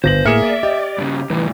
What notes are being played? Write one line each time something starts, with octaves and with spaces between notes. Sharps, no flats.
G1 C5 A#6 F#7
A2 A#3 G#4 E5 F6 C#7 E7
D5
G4 D#5
G2 C#3
C2 A2 E3